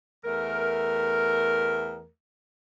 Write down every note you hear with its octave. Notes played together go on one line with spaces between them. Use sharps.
E2 A3 A#4